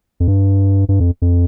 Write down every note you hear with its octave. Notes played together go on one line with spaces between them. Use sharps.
F2
G2
G2
F2
F2